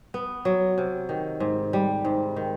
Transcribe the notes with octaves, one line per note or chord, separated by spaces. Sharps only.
B3
F#3
C3
D#3
G#2
G3
G#2
D#3